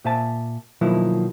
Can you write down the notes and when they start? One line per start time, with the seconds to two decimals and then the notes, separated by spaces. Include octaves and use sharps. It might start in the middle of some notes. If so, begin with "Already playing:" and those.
0.05 A#2 C5 E5 G#5 A5
0.81 B2 D#3 F3 F#3 A#3 E4